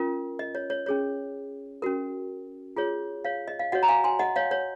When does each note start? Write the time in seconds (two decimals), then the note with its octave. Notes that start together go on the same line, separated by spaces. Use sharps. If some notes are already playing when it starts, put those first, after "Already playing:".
Already playing: C#4 F4 A#4
0.39 D#5
0.55 C#5
0.70 C#5
0.86 C#4 G#4 C#5
1.82 C#4 F#4 A#4
2.76 F4 G#4 C#5
3.25 C#5 F5
3.48 D#5
3.59 F5
3.72 F#4 C#5 D#5 F#5
3.83 A#5
3.88 F5 G#5
4.04 G#5 C6
4.19 D#5 F#5
4.36 C#5 F5
4.51 C#5